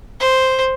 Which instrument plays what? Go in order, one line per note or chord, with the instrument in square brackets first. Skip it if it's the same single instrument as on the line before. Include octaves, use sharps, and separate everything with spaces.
[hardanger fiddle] C5